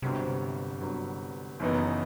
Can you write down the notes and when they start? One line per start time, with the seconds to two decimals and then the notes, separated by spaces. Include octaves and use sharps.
0.02 G1 G2 C3 F#3
0.81 G1 G2 F#3
1.60 F#1 F#2 D#3 E3 B3 D#4